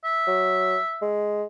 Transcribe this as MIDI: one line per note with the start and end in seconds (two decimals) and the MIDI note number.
0.04 1.07 76
0.27 0.77 54
1.02 1.45 56